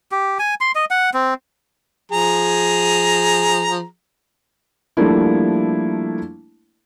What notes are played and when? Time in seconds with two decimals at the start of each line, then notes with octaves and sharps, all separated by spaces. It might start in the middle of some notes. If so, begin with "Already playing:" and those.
0.12 G4
0.39 G#5
0.61 C6
0.75 D#5
0.91 F#5
1.14 C4
2.12 F3 G#4 A#5
4.97 F3 G3 A3 A#3 D4 E4